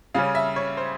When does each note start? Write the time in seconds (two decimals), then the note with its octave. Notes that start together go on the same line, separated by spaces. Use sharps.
0.14 C#3 G3 C#4 F5
0.35 E5
0.56 C#5
0.77 C5